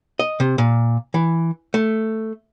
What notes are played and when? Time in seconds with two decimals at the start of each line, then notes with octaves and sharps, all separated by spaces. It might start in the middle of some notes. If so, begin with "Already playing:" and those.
0.19 D#5
0.40 C3
0.58 A#2
1.14 E3
1.74 A3